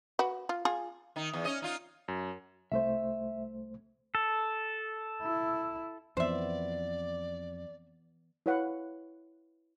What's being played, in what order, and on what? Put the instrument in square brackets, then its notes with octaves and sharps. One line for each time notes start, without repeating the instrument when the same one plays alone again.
[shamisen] F#4 B4
F4
F4 G#4
[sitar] D#3 D#4
E2
C#4 D#5
D#4 F4
[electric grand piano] F#2
[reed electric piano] C2 A3 C5 [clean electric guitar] E5
[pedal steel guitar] A4
[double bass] E4
[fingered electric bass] F2 [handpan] E3 B3 [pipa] C5 E5 [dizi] D5
[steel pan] E4 B4 C#5 F5 F#5